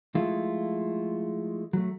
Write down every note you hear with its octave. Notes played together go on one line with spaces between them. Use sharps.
F3 G#3 A3 E4 F4
F#3 A3